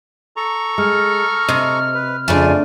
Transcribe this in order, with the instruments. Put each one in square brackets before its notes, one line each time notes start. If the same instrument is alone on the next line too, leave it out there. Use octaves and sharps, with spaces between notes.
[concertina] A4 A#5 C#6
[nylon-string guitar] G#3 [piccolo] F6
[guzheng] C3 [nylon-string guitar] D#5
[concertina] B4
[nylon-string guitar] F2 C#3 [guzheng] A3 D4 [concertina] F4 G#5